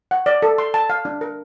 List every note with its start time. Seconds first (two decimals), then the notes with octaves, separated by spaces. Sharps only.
0.11 F#5
0.26 D5
0.42 A4
0.58 C6
0.74 A5
0.90 F5
1.05 D4
1.21 A#4